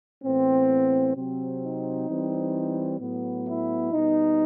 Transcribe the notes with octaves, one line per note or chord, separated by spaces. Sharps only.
A2 E3 B3 C4
C3 F#3 C4
D#4
E3 G3 C4
A2 F#3 B3
E4
B2 G3 B3 D#4